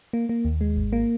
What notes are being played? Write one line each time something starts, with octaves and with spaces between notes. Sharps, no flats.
A#3
A#3
D#2
G#3
G#1
A#3